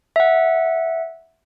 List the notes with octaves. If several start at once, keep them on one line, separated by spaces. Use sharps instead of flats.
E5 F#5